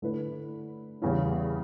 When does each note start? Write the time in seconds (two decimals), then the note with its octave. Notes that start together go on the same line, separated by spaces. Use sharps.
0.02 D3 A3 E4 B4
1.02 E2 C#3 G3 C#4 E4